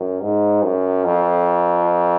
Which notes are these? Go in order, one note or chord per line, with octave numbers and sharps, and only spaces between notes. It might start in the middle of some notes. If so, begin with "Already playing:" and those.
Already playing: F#2
G#2
F#2
F2